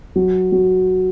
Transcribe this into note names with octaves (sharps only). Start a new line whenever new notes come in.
F#3
F#3